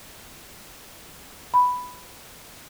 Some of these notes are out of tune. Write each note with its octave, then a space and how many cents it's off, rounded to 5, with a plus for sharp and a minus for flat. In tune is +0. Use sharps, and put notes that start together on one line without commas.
B5 +5